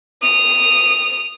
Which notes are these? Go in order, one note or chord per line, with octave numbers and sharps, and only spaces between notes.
D#6 F7